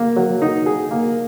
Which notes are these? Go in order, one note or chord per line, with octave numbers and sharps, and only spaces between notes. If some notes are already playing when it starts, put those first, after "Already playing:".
Already playing: A#3
F#3
D#4
G#4
A#3